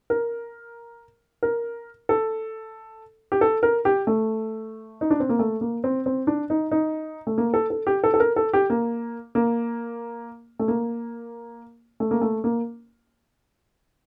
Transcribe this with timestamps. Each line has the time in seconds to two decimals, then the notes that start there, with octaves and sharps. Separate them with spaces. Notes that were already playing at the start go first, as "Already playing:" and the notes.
0.10 A#4
1.43 A#4
2.09 A4
3.32 G4
3.41 A4
3.63 A#4
3.85 G4
4.07 A3
5.01 D#4
5.11 D4
5.20 C4
5.29 A#3
5.39 A3
5.61 A#3
5.84 C4
6.06 C4
6.27 D4
6.50 D#4
6.71 D#4
7.27 A3
7.38 A#3
7.54 A4
7.70 A4
7.87 G4
8.04 A4
8.14 A4
8.20 A#4
8.36 A4
8.53 G4
8.70 A#3
9.35 A#3
10.59 A3
10.68 A#3
12.00 A3
12.11 A#3
12.21 A3
12.44 A#3